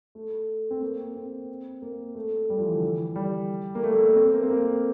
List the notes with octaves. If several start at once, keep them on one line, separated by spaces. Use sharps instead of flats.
A3
C4
A#3
C4
A#3
A3
G3
F3
E3
D3
E3
G3
A#3
A3
A#3
A3
C4
A#3
C4
A#3